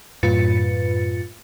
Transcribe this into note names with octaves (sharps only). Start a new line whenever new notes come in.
F#2 A2 F4 B4 A6 C#7